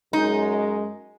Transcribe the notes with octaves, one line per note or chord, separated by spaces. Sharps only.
F#2 G#3 D#4